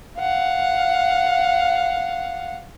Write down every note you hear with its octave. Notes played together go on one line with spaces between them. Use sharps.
F5 F#5